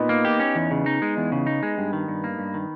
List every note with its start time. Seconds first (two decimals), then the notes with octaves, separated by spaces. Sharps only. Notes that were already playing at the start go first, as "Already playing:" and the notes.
Already playing: A#2 B3 D#4
0.09 A#3
0.25 G4
0.40 C#4
0.55 E2
0.71 C#3
0.86 D#4
1.02 G#3
1.17 E2
1.32 C#3
1.47 D#4
1.63 G#3
1.78 G2
1.93 D#3
2.08 G2
2.24 A#3
2.39 G2
2.54 D#3